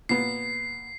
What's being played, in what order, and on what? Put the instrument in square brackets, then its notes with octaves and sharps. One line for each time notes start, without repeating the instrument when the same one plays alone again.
[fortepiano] A#2 B3 [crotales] C7